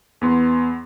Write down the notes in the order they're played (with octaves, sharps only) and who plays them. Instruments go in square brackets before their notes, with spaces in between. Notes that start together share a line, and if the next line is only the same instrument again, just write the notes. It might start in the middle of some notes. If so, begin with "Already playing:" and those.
[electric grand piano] E2 B3 C6